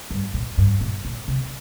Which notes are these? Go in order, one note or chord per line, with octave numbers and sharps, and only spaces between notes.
G2
A#2
G2
A#2
A#2
C3